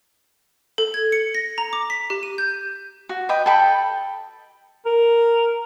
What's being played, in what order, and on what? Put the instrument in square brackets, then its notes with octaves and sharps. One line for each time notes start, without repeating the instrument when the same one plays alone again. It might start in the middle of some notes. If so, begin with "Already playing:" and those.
[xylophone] A4
G#6
C#7
A#6
A#5
D6
B6
G4
D#7
G6
[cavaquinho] F#4
B4 D#5 G5
A4 G5 B5
[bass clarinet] A#4